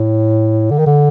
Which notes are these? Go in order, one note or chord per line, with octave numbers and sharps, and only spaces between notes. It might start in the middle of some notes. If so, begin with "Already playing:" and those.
Already playing: A2
D3
D#3
D3